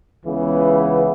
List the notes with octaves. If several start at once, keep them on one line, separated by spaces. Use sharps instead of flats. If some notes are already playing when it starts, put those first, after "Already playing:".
C#2 C#3 E3 B3